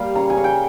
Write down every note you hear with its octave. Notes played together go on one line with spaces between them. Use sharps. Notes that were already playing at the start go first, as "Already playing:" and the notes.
Already playing: G3 A#3 F5
C#3 A#5
G#5
C#3
G5